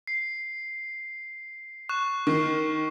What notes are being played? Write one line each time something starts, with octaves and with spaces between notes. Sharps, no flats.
C7
C#6 F#6 E7
D#3 C#6 C7